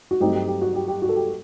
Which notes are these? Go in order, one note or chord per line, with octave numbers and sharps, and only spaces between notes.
F#4
G2 F#3 A3 C4 D#4 G4
G4
G4
F#4
G4
G4
F#4
A4
G4